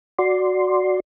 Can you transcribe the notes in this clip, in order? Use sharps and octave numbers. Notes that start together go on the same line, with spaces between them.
F#4 D5 C6